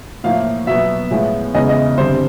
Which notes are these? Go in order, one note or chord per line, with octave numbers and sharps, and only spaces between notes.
A2 F3 A#3 F5
B2 F#3 B3 E5
A2 F3 G#3 B3
E2 C#3 E3 G#3 D#5
D#5
G2 D3 G3 C4 C5